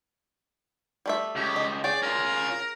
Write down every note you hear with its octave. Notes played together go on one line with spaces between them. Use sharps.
G3 A3 E5
C#2 G4
D#5
G#4 C#5 D5 G5
C#4 F4 A#4